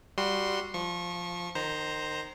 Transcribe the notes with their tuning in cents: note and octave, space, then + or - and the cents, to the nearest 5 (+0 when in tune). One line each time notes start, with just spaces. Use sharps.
G3 +0 F#4 -15 C6 +0
F3 +0 C#6 -30
D#3 -25 C5 +0 A#5 +0